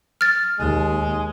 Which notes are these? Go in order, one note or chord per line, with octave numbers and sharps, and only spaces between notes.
F6 A6
D#2 G#3